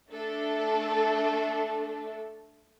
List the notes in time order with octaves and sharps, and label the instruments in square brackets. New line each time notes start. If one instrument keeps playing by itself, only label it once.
[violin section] A3 D4 A4